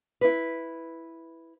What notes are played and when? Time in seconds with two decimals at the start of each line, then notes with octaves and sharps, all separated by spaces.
0.21 E4 B4